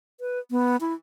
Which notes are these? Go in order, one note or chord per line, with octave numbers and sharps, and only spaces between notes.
B4
B3
E4